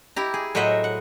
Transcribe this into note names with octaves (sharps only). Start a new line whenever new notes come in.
E4 G4 A#5
G#4
A2 F#3 C5 D#5 E5 F#5
F#5